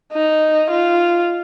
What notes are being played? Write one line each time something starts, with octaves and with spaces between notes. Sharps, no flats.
D#4
F4